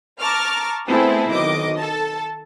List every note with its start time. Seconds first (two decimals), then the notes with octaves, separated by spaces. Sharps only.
0.20 A5 A#5 C#6 D6 F6
0.88 A3 B3 C4 E4 G#4 A4
1.29 B1 D#3 D#5 D6
1.78 A4 A5